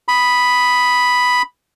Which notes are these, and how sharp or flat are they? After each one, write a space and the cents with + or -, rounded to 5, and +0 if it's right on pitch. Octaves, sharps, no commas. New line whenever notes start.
B5 +0 D#6 +0